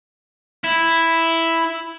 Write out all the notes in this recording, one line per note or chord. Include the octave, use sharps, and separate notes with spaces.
E4